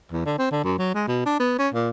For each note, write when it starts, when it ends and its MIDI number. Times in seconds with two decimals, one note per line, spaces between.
0.12 0.24 40
0.26 0.33 50
0.38 0.47 60
0.51 0.63 50
0.64 0.77 42
0.78 0.91 54
0.94 1.06 56
1.08 1.22 47
1.25 1.37 62
1.40 1.54 59
1.59 1.69 61
1.74 1.90 46